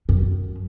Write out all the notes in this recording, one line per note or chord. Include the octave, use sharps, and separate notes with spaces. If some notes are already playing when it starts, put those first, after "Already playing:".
F#2